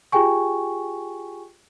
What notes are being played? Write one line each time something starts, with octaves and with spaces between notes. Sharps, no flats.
F4 G4 G#4 G5 G#5 C#6